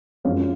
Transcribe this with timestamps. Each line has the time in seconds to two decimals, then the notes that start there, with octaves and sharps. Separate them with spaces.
0.24 F#2 F3 G#3 C#5 F5